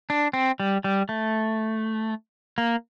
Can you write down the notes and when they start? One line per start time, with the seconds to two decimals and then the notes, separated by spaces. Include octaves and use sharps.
0.10 D4
0.33 C4
0.60 G3
0.84 G3
1.09 A3
2.58 A#3